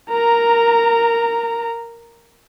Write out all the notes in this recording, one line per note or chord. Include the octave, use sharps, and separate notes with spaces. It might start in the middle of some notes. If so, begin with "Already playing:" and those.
A#4 A#5